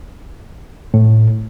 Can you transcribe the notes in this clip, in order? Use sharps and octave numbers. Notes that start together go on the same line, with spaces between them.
A2